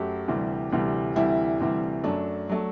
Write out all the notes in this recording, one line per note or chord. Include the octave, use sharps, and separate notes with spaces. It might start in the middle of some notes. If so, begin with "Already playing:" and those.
Already playing: F#2 F#3 A3 G4
D2 C3 E3 G3
D2 C3 E3 G3
D2 C3 E3 G3 E4
D2 C3 E3 G3
F#2 F#3 A3 D4
F#3 A3